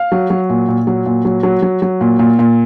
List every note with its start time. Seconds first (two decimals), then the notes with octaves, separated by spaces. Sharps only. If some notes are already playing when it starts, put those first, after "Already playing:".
Already playing: F5
0.12 F#3
0.30 F#3
0.49 A#2
0.68 A#2
0.87 F#3
1.06 A#2
1.25 F#3
1.43 F#3
1.62 F#3
1.82 F#3
2.01 A#2
2.19 A#2
2.39 A#2